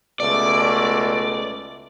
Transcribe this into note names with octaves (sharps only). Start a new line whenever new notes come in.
C#2 B2 A3 D5